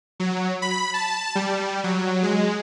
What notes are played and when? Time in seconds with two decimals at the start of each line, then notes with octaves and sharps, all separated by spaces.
0.20 F#3
0.62 B5
0.94 A5
1.35 G3
1.84 F#3
2.23 G#3